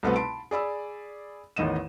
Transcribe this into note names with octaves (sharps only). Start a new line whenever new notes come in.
C2 B2 A3 B3 C4 B4
A5 B5 C6 D7
G#4 D5 B5 E6
A1 E2 D#3 D#5 D#7 E7